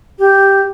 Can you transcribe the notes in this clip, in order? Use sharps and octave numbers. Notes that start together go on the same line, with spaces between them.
G4